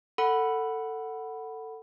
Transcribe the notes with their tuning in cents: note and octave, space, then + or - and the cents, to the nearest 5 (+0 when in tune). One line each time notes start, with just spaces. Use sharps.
A4 +20 F#5 +5 B5 +0